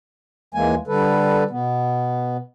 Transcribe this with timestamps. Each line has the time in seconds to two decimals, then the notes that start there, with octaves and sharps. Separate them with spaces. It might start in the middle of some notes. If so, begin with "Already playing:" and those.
0.54 D#2 E3 G#3 A#3 G#5
0.87 D3 G3 A4 B4
1.50 B2 B3